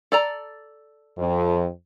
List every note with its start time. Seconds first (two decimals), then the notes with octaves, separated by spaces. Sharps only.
0.12 A4 D5 A#5
1.18 F2